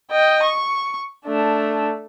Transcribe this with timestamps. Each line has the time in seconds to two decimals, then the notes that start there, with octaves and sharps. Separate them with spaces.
0.11 D#5 G5
0.43 C#6
1.26 A3 D4